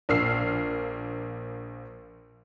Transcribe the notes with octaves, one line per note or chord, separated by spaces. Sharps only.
A#1 A#3 E6 F6 C7